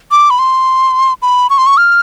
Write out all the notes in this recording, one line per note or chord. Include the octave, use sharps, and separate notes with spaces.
D6
B5
C6
B5
C#6
C6
C#6
F6